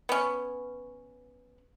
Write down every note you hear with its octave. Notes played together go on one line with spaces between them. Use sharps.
B3 C#4